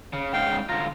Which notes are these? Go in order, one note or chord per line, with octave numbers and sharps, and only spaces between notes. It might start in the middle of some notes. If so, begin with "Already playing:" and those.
C#3
G#2 C#3 F5 G5
D3 F4 A#5